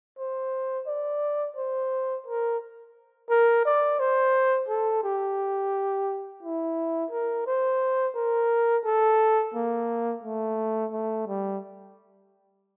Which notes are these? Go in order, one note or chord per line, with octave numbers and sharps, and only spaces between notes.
C5
D5
C5
A#4
A#4
D5
C5
A4
G4
E4
A#4
C5
A#4
A4
A#3
A3
A3
G3